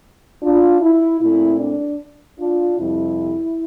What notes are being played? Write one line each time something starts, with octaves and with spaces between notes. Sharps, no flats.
D4 F4
E4
A#2 A3 C4 E4
D4
D4 F4
F2 C3 G3 E4